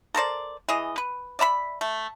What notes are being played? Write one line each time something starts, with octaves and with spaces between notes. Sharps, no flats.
A4 A#4 C5 D5
E3 G#4 D#5
B4
D5 E5 A#5 B5
A3